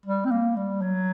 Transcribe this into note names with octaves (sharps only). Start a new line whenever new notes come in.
G3
C4
A#3
G3
F#3